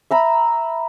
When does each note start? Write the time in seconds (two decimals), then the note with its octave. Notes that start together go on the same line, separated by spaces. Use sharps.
0.11 E5 A#5 B5